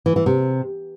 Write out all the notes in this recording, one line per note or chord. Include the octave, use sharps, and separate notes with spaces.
E3
E3
C3